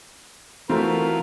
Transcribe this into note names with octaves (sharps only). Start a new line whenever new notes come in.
E3 A3 C4 F4 F#4 A#4